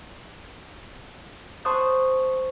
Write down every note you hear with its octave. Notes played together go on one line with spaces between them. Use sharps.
C5 A5 C6 C#6 D#6 F#6